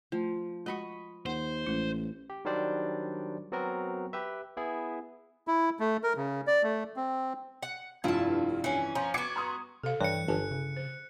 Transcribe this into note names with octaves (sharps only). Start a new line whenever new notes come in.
F3 A3
G#3 F#4 D#5 F#5 B5 C#6
D#2 C5 F#5
A1 G#3 E4
G4
D#3 F#3 G3 D4 C5 D5
F#3 B3 C4 F#4 A#4
G4 B4 E5
B3 E4 G#4
E4
A3
A#4
C#3
D5
A3
C4
F#5
F1 G2 E4 F4 A5
E3 C#4
F3 C#4 A#5
B3 F#4 D6 G#6 C#7
A#5 C6 D#6
C3 A4 C5 F5
G2 E3 C#5 F#6 C#7
G1 G#5 A5
C#3
C5